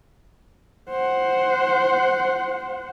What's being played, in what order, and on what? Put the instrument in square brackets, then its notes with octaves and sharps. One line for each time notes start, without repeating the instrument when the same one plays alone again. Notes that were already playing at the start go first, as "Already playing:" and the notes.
[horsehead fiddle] C5 F#5